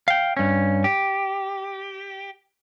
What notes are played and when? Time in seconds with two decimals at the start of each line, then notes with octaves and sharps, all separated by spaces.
0.08 F5 G5
0.37 G2 C#4
0.84 G4